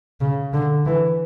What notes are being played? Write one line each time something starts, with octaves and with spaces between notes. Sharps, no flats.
C#3
D3
E3